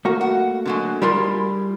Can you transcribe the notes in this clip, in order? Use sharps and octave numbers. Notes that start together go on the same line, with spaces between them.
A3 A#3 F#4
F#5
D3 F#3 G#3
G3 E4 F4 G#4 A#4 C6